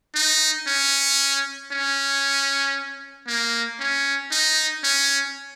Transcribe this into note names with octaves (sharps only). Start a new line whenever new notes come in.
D#4
C#4
C#4
A#3
C#4
D#4
C#4